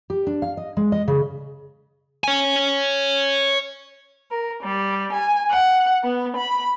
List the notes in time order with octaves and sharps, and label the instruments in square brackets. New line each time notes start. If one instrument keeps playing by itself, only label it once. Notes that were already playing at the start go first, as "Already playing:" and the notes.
[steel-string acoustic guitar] G4
D4
F5
D#5
G#3
D#5
C#3
[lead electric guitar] C#5 G#5
[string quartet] A#4
G3
G#5
F#5
B3
B5